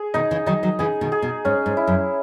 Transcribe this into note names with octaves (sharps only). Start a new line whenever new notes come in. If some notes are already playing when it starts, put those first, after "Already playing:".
Already playing: G#4
B2 D#3 D#4
C#3 E3
D#3 F#3 D#4
D#3 F#3
C#3 E3 G#4
B2 D#3
G#4
B2
G#2 C#4
G#2
E4
F#2